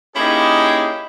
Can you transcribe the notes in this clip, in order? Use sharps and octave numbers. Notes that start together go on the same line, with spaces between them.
A#3 C#4 D#4 E4 G4 G#4